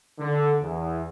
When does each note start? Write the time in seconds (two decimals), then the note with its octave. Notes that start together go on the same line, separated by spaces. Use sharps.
0.19 D3
0.61 E2